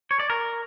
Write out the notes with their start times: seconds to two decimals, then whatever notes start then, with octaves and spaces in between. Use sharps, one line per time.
0.11 C#5
0.20 D5
0.30 A#4